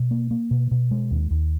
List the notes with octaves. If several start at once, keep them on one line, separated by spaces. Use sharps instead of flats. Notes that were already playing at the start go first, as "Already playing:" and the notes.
Already playing: B2
A#3
A#3
B2
B2
G#3
D#2
D#2